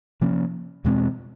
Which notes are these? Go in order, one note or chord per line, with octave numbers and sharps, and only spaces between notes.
C3 F3 A#3 C#4
E2 B2 G#3 C4